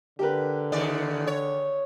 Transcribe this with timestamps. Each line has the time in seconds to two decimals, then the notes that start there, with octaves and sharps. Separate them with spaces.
0.19 D3 G4 A#4 B4
0.72 D#2 C#3 D5
1.27 C#5